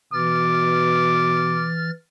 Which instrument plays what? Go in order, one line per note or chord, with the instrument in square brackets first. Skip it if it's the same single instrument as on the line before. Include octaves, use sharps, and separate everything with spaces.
[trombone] B2 [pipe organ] E3 F6 A6 [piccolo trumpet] D6